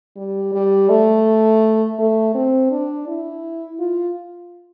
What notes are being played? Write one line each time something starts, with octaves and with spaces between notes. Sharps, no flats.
G3
G3
A3
A3
C4
D4
E4
F4